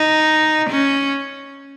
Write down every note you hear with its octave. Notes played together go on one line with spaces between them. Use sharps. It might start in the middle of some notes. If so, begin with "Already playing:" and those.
Already playing: D#4
C#4